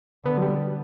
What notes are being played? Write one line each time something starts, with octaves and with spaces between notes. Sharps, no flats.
D3 B3
F#3
G3